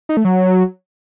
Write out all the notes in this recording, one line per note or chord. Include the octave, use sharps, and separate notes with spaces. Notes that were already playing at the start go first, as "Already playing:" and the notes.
D#4
A3
F#3